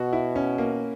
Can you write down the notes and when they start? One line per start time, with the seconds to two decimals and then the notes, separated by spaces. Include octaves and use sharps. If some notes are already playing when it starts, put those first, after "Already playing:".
Already playing: B2 F#4
0.13 E4
0.36 C#4
0.58 A#3